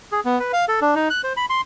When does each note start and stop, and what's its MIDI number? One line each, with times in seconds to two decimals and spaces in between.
0.12 0.20 68
0.25 0.39 59
0.40 0.52 71
0.53 0.65 77
0.68 0.80 69
0.81 0.95 62
0.95 1.09 63
1.10 1.21 90
1.24 1.33 72
1.37 1.46 83
1.50 1.61 84